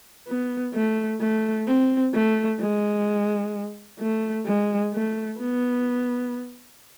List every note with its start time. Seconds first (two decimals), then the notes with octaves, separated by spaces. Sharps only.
0.28 B3
0.75 A3
1.21 A3
1.67 C4
2.14 A3
2.60 G#3
4.00 A3
4.46 G#3
4.93 A3
5.39 B3